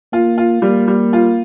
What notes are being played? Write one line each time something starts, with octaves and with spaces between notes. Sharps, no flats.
A#3 F4
F4
G3 A#3
G3
F4